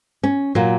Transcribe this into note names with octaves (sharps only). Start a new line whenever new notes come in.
C#4
A#2 F#3 A#3